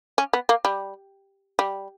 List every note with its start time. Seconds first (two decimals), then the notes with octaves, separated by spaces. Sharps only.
0.18 C#4
0.33 B3
0.49 A#3
0.65 G3
1.59 G3